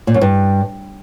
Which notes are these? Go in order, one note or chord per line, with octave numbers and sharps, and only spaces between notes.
A#2
F#2
G2